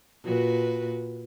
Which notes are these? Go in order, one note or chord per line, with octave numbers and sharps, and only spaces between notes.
A#2 F#4 B4